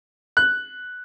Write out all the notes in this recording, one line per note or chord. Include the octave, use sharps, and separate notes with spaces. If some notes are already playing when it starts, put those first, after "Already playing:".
F#6